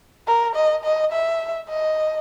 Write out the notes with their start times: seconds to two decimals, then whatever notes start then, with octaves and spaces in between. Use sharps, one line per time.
0.27 A#4
0.56 D#5
0.84 D#5
1.12 E5
1.69 D#5